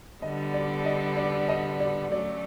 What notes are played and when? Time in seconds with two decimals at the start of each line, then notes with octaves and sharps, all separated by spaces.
0.22 D3 G3 B3 D#5
0.54 D5
0.85 D#5
1.17 D5
1.49 D#5
1.80 D5
2.12 F#3 A3 C#4 D5